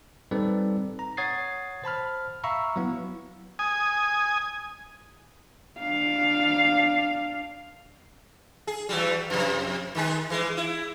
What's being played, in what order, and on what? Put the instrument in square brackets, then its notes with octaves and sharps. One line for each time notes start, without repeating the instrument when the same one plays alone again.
[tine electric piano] G3 C4 D#4 A4 B4 D5
A#5
C#5 F#5 D#6 G#6 A6 C7
C5 A5 B5 F6
E5 F5 A#5 B5 C#6 E6
F#3 B3 E4
[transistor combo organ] G#5 D#6
[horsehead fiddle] D4 F5
[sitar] G#4
E3 F#3 G3
F2 C3
D#3 G#3 G#4
E3 G#3
E4